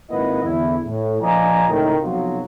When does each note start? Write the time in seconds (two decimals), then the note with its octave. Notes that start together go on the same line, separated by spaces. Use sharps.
0.11 G#1 A#3 E4 B4 D#5 F#5
0.45 E2 D3 E4
0.86 A2
1.22 A#1 F3 D5 D#5 G#5 A#5
1.69 C#2 A2 C3 D#3
2.02 B1 C3 F3 F#3 F4 F#4